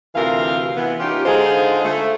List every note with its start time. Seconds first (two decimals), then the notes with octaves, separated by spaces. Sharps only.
0.15 D2 C3 E3 F4 A#4 F5
0.77 E3 B3
1.00 C#4 D#4 F4 G4
1.25 D3 G#3 D#4 F4 G#4 C5
1.85 A3